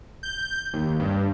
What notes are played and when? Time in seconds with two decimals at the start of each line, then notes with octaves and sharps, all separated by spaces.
0.23 G6
0.73 D#2
1.00 G2